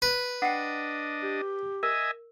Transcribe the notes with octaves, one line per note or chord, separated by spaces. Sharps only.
B4
D4 D#5 F#5 G5
G4
A#4 D#5 E5 G#5